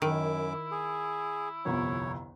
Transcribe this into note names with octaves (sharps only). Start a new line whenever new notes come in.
F#2 D#3 E4 D6
G#4
G1 C2 F2 C#5